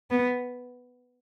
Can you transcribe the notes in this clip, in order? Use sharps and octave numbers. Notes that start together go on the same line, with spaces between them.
B3